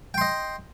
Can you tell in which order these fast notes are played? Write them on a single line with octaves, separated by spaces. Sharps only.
G5 C6 D#5